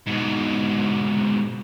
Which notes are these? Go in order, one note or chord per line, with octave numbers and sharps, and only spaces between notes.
G#2 B2